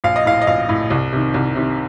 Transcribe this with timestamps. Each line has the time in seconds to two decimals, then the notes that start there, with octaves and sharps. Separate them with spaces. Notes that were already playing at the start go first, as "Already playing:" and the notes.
0.04 A#1 F5
0.16 D#5
0.25 A2 F5
0.42 D#5
0.47 A#1 F5
0.69 A2
0.90 C2
1.12 C3 D#3
1.34 C2
1.56 C3 D#3